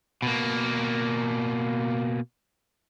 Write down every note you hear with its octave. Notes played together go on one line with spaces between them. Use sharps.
B2 A#3